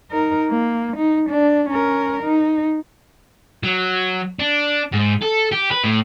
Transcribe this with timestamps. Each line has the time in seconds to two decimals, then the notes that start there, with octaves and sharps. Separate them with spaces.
0.11 D#4 A#4
0.50 A#3
0.97 D#4
1.30 D4
1.69 C#4 A#4
2.23 D#4
3.64 F#3
4.39 D4
4.92 G#2
5.22 A4
5.51 G4
5.71 B4
5.84 A2